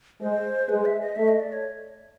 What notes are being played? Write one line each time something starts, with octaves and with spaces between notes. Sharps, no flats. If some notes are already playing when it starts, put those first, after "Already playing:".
G#3 C5
G#3 B4
E5
D#5
A3 E5
D#5
D5
C#5